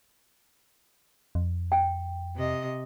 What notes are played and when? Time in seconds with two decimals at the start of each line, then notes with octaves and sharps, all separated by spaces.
1.35 F2
1.72 G5
2.35 C3 D#5